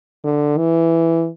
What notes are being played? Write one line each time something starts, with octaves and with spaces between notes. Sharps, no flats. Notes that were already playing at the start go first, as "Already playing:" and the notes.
D3
E3